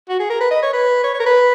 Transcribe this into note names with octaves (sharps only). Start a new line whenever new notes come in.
F#4
G#4
A#4
B4
D#5
C#5
B4
C#5
C#5
A#4
B4